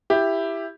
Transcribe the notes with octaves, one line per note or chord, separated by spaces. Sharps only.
E4 G4